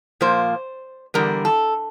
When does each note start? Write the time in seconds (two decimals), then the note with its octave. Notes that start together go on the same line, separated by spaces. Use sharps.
0.21 A#2 F3 A#3 C5
1.14 E2 D3 G3 A#4
1.45 A4